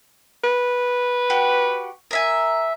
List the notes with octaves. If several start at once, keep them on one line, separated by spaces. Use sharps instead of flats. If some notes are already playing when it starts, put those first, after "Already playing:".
B4
F#4 G4 F#5
A#4 E5 G#5